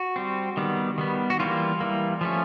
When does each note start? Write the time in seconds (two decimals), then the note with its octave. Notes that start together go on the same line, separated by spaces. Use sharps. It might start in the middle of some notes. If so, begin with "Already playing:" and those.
Already playing: F#4
0.16 G3 C4
0.57 D#3 G3 B3
0.98 D#3 G3 B3
1.30 F#4
1.39 E3 G3 A#3 F4
1.80 E3 G3 A#3
2.21 F3 A3 C#4